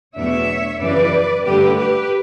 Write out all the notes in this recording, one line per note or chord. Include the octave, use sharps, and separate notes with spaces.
E2 B2 F#3 A3 D4 C#5 E5
F#2 C#3 E3 B4 D5
G2 D3 A3 G4 B4
G4 B4